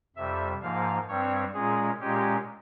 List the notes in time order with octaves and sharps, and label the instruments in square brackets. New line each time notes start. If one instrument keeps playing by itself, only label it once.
[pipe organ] F2 C3 G3 E5
G#2 F3 A#3 F5
G2 G3 C4 C#5
A#2 G#3 C#4 G#4
A#2 G#3 C#4 G4